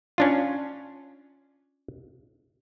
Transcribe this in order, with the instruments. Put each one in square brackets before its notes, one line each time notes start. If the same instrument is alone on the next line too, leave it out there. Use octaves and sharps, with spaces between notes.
[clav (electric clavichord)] C#4 D4 F4